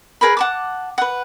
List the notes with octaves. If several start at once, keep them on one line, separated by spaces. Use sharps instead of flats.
G#4 A#4 B4 B5
F#5 A5 D6
B4 F#5